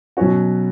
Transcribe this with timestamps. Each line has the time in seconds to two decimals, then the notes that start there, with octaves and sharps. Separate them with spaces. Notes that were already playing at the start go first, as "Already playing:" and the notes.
0.17 B2 F#3 C#4 F#4